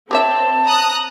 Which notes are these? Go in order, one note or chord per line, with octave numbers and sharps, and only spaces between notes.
C4 G4 C#5 E5 A5
A#5 D#6 F#6